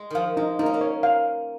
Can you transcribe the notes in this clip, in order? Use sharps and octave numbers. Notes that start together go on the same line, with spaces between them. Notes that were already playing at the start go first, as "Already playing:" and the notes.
Already playing: G#3
D#3 F3 F5
G#3 D#4
A#3 D#4
C#4
A#3
C#5
F5